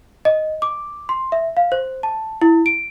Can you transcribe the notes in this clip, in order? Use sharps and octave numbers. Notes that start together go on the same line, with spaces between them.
D#5
D6
C6
E5
F5
C5
A5
E4
D7